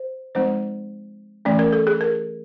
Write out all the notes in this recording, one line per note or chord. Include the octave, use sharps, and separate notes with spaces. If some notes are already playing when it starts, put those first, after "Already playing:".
Already playing: C5
F3 G#3 C4 D#4 C5
E3 A3 C#4 D5
A#4
A4
G#4
A#4